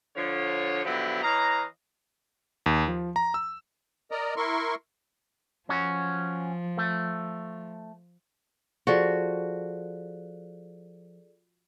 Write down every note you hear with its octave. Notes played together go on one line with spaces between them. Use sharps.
D3 F3 C#5
B2 D3 F3 F#3 E4 G4
E3 C#5 D#5 F5 A#5
D#2
F3
A#5
E6
A#4 D5 D#5 A#5
E4 A#4 C6 C#6
F3 C#4 F#4
A3
F3 F#4 G#4 A4 D5